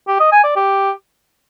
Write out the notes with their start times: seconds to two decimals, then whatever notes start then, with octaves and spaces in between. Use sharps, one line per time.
0.08 G4
0.20 D#5
0.32 G#5
0.44 D5
0.56 G4